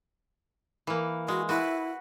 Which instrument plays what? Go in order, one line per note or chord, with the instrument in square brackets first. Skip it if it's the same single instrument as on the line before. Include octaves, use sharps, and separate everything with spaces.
[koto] E3 A#3
[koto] G#3 [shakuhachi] F#4
[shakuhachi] E4 [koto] F#4 B4